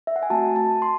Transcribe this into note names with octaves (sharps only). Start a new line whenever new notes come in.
E5
F#5
G#5
A3 C4 F#4 A5
A5
C6